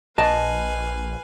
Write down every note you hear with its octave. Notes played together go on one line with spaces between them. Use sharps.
A#1 B4 D#5 F5 G#5 A5